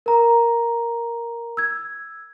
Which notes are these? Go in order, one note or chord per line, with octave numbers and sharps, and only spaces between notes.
A#4 A#5
E6 G#6